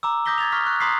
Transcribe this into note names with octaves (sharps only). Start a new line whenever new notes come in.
A#5 D6 E6
D6 D#6 G6 A#6 B6 G7
G#6 A6 F7
C#6 F6 B6
C#6 F#6
A#5 C6 D#6 B6 C7